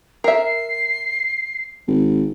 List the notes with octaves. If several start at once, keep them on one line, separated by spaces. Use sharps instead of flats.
A#4 E5 C7
G#1